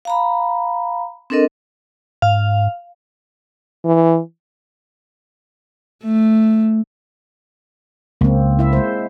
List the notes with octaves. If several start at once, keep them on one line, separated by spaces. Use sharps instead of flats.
F5 A#5 B5
C4 D4 A4 A#4 D#5
G#2 F5
E3
A3
C#2 A#3 C4
E4 E5
G#3 C5